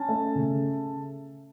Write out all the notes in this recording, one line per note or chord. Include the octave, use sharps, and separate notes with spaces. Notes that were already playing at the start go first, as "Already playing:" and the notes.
Already playing: C#4 A5
A3
C#3